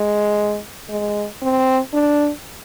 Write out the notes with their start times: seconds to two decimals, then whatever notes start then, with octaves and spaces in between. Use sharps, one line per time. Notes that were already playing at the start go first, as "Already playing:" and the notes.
Already playing: G#3
0.90 G#3
1.42 C4
1.93 D4